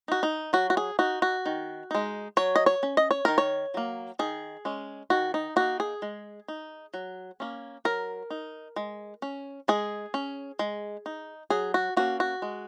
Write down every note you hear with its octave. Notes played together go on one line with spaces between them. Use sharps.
D#4 F#4
D#4
F#3 F#4
F#4
G#4
D#4 F#4
F#4
D#3
G#3 D#4
F#3 C#5
D#5
C#5
C#4
D#5
C#5
D#3 A#4
C#5
F#3 A#3
D#3 G#4
G#3 C#4
D#3 F#4
D#4
A#3 D#4 F#4
G#4
G#3
D#4
F#3
A#3 C#4
F#3 A#4
D#4
G#3
C#4
G#3 G#4
C#4
G#3
D#4
F#3 G#4
F#4
A#3 C#4 F#4
F#4
G#3